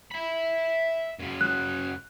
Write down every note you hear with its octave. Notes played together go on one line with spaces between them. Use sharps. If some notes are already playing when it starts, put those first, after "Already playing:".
E5 B5
F#2 C#3
F#6